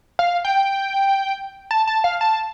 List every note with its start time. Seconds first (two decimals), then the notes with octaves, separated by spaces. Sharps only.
0.19 F5
0.45 G5
1.71 A5
1.87 A5
2.04 F5
2.21 A5